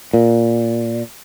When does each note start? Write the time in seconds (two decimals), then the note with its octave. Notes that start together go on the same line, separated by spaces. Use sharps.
0.13 A#2